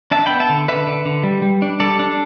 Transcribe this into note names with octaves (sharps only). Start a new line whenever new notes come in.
D4 E5 A5
B3 G5 B5
E5 A5
D3
D3 B4 E5
D3
D3
G3
G3
D4
G3 A4 D5
D4